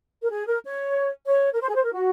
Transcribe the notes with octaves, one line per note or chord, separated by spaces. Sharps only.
A#4
G#4
A#4
C#5
C#5
A#4
C5
G#4
C5
A#4
F#4